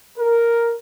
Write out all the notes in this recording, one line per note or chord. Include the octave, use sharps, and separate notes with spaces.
A#4